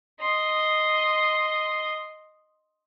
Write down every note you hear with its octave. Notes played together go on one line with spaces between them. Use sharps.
D#5 C6